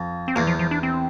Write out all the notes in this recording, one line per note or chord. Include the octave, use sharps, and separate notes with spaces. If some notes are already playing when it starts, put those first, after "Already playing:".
Already playing: F2
C4
E2 A#3
F3
F3
D4
C4